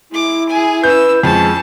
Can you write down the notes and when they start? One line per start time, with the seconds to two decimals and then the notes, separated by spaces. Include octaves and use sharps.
0.11 G#3 E4 D6
0.49 G#4 G#5
0.84 C#4 B4 E6 G6
1.23 F2 G#3 C#4 A5